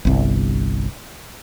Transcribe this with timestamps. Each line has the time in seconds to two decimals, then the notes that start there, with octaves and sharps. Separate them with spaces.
0.05 G1 C2